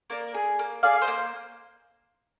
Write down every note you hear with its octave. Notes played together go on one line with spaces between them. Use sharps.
A#3 A#4 D5
G#4
A#3
G#4 D5 F5
C5 D#5
A#3